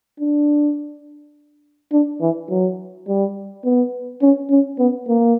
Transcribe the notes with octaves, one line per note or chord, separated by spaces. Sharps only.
D4
D4
E3
F#3
G3
B3
C#4
C#4
B3
A#3